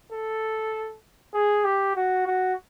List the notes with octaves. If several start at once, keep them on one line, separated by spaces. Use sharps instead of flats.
A4
G#4
G4
F#4
F#4